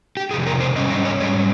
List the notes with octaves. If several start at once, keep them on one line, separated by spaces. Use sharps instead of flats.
G4
F2 C3 D#3 G#4
A#4
C5
G#2 G3 C#4 D#5
D#5
C#5
G#2 G3 C#4 C#5